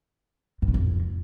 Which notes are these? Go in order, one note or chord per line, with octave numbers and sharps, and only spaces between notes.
G#2
A#2
F2